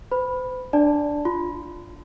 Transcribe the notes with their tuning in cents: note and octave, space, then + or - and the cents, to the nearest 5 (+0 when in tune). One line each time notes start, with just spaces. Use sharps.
C5 -40 B5 +0
D4 +0 D5 +0 A5 +0
F4 +0 C6 -35